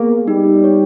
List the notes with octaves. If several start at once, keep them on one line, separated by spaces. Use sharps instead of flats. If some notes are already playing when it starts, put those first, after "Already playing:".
Already playing: A#3 B3 G#4
G3 D#4
C#5